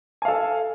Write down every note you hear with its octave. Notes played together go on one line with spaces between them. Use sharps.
A4 F5 G#5